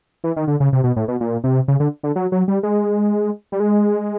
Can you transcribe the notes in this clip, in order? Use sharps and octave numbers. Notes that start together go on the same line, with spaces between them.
E3
D#3
D3
C#3
C3
B2
A2
B2
A#2
C3
C#3
D3
D3
F#3
F#3
G3
G#3
G3
G#3